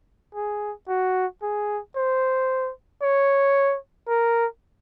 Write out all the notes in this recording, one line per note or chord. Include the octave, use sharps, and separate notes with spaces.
G#4
F#4
G#4
C5
C#5
A#4